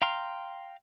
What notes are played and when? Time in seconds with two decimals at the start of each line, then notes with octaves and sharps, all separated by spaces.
0.02 F5 G5 A#5 C6 F6